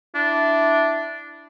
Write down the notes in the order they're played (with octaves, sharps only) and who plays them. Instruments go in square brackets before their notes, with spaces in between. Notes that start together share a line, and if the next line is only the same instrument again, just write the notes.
[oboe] D4 [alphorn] E4